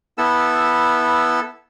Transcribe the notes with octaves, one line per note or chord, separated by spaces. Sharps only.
B3 E4 A4 E6